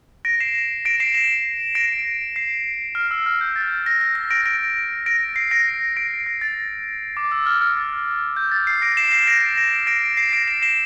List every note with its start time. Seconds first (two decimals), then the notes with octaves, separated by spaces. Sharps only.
0.25 A#6 D7
0.40 C7 E7
0.85 A#6 D7
1.00 C7 E7
1.15 C7 E7
1.75 A#6 D7
2.36 C7
2.95 F6
3.11 E6
3.26 F6
3.41 G6
3.56 A6
3.86 A#6
4.01 A#6
4.15 A#6
4.31 A#6 D7
4.46 A#6 D7
5.06 A#6 D7
5.36 C7
5.51 A#6 D7
5.97 A#6 D7
6.26 A#6
6.41 A6
7.17 D6
7.32 E6
7.46 F6
7.61 F6
7.77 A6
8.36 G6
8.52 A6
8.67 C7
8.82 A#6 D7
8.97 C7 E7
9.12 C7 E7
9.27 A#6 D7
9.57 A#6 D7
9.87 A#6 D7
10.17 C7
10.32 A#6 D7
10.48 C7 E7
10.62 C7 E7